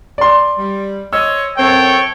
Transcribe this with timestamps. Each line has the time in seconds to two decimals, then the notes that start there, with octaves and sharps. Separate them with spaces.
0.18 D5 C6
0.58 G3
1.13 C5 C#5 D#5 E6
1.58 F#2 C4 A4 C#5 G5